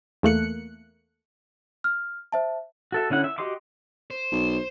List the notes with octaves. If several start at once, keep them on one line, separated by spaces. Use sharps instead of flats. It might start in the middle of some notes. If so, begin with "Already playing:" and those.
E2 A3 A#3 F#6 C#7
F6
C5 E5 A5
F#4 A4 E5
D3 C#4 E4 F#5
E5
F#4 G4 D#5 C6 D6
C5
B1